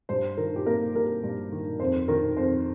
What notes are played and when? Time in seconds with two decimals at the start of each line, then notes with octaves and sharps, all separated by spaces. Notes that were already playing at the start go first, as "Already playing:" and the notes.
0.09 G2 C5
0.37 D#3 A#4
0.56 G4
0.66 A#3 A#4
0.95 G3 A#4
1.24 G2
1.52 D#3
1.80 F2 C5
2.08 D#3 A#4
2.37 F2 C5